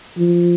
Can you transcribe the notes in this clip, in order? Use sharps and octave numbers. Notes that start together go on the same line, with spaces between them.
F3